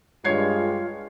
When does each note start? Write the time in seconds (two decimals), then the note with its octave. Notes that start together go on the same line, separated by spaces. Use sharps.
0.25 G2 G#3 F4 C#5 G#6 C7